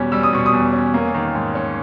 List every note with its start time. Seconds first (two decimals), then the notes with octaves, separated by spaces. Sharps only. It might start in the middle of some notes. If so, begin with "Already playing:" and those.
Already playing: E2 B2 G3 C#4
0.12 G3 E6
0.23 D#6
0.33 B2 C#6
0.46 D#6
0.53 E2
0.73 C#4
0.94 A#3
1.14 D#3
1.35 G#2
1.55 C#4